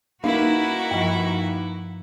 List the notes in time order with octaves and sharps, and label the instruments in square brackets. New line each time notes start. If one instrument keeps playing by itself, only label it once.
[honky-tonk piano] A#3 D#4 [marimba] C#4 [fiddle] E4 B4 [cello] F#4 A#4
[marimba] G2 F3